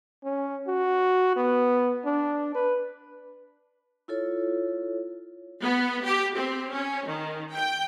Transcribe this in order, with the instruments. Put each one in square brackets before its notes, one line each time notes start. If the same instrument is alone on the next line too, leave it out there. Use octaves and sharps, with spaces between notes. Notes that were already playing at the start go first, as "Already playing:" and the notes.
[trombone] C#4
F#4
B3
D4
B4
[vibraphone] E4 F4 A4 C#5
[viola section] B3
G4
C4
C#4
D#3
G5